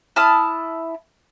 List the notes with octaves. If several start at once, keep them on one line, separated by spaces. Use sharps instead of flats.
E4 A5 D#6 F6